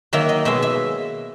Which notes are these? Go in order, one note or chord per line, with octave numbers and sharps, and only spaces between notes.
D#3 F#3 A#3 E5
D#5
B2 G#3 E5
E5